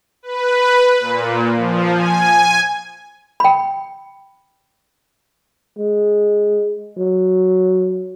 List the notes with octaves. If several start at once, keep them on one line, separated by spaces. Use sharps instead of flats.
B4
A#2
F3
G#5
G5 B5
G#3
F#3